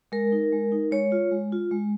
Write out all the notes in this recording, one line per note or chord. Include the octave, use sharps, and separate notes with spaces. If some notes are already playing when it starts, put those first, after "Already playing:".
G#3 A#4
D#4
G#3
D#4
G#3 C#5
F4
G#3
F4
G#3